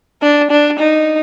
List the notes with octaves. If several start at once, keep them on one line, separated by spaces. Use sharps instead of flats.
D4
D4
D#4